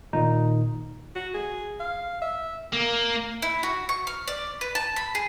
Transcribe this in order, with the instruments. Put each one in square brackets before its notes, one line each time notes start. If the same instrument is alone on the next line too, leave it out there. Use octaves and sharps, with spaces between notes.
[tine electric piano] A#2 D#3 D#4
[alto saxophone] F#4
G#4
F5
E5
[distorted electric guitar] A#3
[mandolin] E4
F#4
C#6
F6
D5
B4
A5
B5
G#4